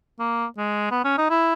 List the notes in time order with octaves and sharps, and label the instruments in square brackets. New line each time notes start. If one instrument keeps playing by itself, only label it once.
[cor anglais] A#3
G#3
B3
C#4
D#4
E4